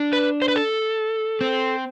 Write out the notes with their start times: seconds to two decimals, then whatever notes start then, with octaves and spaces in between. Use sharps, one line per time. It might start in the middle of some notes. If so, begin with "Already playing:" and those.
Already playing: D4
0.13 B4
0.42 C5
0.48 B4
0.56 A4
1.41 C4